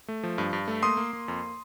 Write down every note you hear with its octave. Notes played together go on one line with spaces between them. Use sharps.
A3
F3
G2
G2
A3
A#3 C6 D#6
A#3
A#3
F2